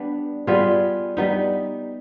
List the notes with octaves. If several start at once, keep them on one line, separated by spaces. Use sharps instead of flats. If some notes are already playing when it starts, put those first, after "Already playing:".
Already playing: G3 B3 D4
G3 B3 F4 G#4
G3 B3 D#4